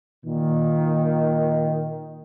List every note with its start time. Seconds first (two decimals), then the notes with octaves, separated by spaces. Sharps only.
0.24 A#2 D#3